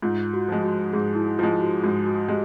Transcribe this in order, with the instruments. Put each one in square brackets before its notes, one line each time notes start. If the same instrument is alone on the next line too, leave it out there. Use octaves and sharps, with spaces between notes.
[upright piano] G#2 [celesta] F4
[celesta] F#4
[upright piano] F3 G#3
[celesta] F#4
[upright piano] G#2 [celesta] G#4
[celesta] E4
[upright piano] F3 G#3 [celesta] F4
[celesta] F#4
[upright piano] G#2 [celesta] F#4
[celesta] F#4
[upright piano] G#3 [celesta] G4